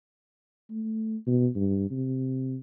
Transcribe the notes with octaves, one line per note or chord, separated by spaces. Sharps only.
A3
B2
G2
C3